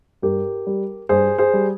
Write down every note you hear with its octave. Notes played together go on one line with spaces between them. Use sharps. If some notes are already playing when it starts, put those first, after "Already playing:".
G2 G4 A#4
G3
G2 G#4 C5
G#4 C5
G3